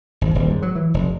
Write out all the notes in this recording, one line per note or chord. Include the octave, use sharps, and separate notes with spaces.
G#1
D#1
G#2
F#3
E3
F1